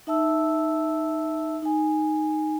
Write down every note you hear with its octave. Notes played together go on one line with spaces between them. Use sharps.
D#4 E5 A5 E6
D#4 G#5